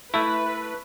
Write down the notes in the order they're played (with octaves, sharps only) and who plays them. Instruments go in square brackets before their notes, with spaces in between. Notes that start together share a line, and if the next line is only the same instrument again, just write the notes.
[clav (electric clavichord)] A3 E4 [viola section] B4 [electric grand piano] A5 C#6 E6